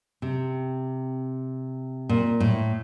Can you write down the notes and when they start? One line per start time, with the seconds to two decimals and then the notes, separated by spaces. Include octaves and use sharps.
0.22 C3
2.09 A#2
2.40 A2